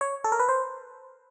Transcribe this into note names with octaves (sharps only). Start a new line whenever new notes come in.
C#5
A4
A#4
B4
C5